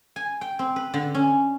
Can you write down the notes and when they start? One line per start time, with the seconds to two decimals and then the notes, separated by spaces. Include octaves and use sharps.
0.16 G#5
0.41 G5
0.59 C4
0.76 B4
0.94 D3
1.15 C#4